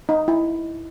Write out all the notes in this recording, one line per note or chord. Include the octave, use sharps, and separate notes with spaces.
D#4
E4